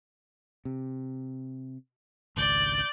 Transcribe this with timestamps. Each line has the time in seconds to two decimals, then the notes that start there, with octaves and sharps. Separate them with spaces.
0.65 C3
2.37 G#1 C#2 D5 G6